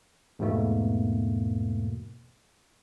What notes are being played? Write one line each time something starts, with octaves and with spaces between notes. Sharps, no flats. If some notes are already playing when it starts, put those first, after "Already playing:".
E2 G#2 B2 A3 A#3